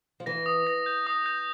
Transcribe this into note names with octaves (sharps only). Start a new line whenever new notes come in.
F3
E3 A#6
D#6
A#6
G6
D#6
G6